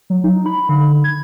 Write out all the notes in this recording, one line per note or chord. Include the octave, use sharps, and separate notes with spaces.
F#3
D#4
B5
D3
G#6